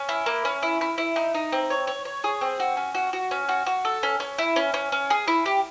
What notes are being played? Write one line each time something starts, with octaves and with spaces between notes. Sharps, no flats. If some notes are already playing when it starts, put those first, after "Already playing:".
Already playing: C#4
E4
A#3
C#4
E4
E4
E4
D#4
D#4
C4
C#5
C#5
C#5
G#4
C4
F#4
C#4
F#4
F#4
C#4
F#4
F#4
A4
C#4
C#4
E4
C#4
C#4
C#4
G#4
E4
G4